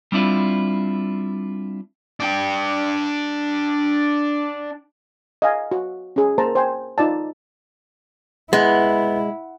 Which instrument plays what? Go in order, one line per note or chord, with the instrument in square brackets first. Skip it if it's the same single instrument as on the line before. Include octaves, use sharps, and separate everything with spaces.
[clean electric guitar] G3 C4 D4 E4 F4
[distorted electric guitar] D4 G5
[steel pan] D#5 F5 G#5
F#4
C#4 G#4
A#3 A#4 C5 A5 A#5
C5 G5 G#5
D#4 F4 D5 A5
[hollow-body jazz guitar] G#3 [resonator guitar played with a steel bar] B3 [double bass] E4